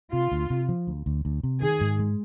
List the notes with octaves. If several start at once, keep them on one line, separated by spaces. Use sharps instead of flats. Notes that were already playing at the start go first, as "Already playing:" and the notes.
C3 F4
D2
C3
F3
D2
D2
D2
C3
D#3 G#4
G#2
G#3